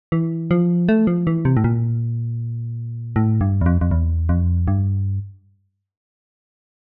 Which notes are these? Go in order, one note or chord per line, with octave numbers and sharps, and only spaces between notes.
E3
F3
A3
F3
E3
C3
A2
A#2
A2
G2
E2
F2
F2
E2
F2
G2